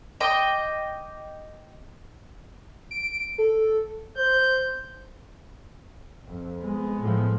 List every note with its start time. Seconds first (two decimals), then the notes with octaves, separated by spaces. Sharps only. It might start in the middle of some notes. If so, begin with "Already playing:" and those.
0.20 D#5 G5 D6
2.91 D7
3.38 A4
4.17 C5 G6
6.26 F2
6.61 G#3 B3
7.00 A2 F3